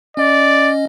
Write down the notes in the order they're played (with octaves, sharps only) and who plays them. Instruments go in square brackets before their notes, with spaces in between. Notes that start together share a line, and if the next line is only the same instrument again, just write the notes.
[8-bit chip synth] C#4 D#5 [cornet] D5